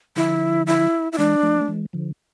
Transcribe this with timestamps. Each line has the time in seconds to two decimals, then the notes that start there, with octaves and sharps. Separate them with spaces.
0.16 D3 F3 E4
0.67 E4
1.12 E4
1.18 E3 G#3 D4
1.42 F3 A3
1.61 A3
1.68 E3 G#3
1.93 D3 F3